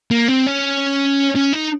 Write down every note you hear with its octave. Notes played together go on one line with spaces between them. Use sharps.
A#3
C4
C#4
C#4
D#4